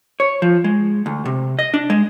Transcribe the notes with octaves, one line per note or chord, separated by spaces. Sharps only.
C#5
F3
G#3
D2
C3
D#5
D4
G#3